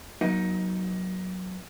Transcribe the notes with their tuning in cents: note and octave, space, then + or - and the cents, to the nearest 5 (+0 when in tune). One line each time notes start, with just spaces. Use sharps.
F#3 +0 A#3 +40 D#4 +15